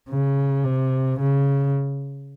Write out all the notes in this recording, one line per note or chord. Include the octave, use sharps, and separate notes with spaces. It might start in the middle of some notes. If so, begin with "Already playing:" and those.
C#3
C3
C#3